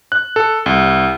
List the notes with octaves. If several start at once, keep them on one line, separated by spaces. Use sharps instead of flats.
F#6
A4
C2